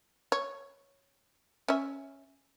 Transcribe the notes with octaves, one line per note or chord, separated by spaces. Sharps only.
C#5
C#4 E5